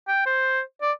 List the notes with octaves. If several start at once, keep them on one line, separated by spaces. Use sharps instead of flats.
G5
C5
D5